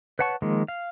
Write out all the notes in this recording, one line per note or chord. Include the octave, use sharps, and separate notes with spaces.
B4 C#5 F#5 A5 C#6
D#3 F3 G#3 A#3
F5